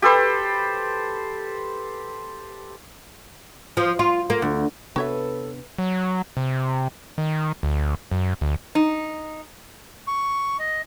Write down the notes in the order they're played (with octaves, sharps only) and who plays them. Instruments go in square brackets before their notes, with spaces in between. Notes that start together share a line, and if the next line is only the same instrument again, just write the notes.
[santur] G4 A4 B4 C5
[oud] F3
F4
A#3
D2
[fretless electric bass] C3 B3 D4 [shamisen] F#4 C#5 E5 [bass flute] A4 [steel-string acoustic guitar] B4
[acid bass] F#3
C3
D#3
D2
F#2
D2
[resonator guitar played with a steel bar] D#4
[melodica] C#6
D#5